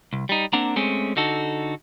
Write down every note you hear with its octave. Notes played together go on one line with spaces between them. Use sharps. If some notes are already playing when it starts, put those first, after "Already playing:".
C2
G3 D#4
A#3 C4 D4 F#5 A#5
G#3 A3 C4 C#4
D3 D#4 F#4 A4